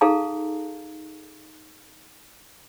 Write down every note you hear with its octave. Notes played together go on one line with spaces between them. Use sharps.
D#4 G#4 A4 F5 A5 A#5